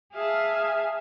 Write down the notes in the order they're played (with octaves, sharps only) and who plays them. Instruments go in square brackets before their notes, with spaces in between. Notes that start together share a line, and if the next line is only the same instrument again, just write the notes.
[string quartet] G#4 E5 F5 G#5 A5